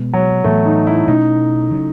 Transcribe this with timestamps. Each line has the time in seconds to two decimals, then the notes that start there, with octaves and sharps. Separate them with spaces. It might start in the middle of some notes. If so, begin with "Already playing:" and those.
Already playing: B2 G#3 B3
0.13 F#3
0.44 A2 E3 A3 B3
0.65 D#4
0.87 E4
1.08 B2 A3 C#4 D#4
1.71 C#3 F#3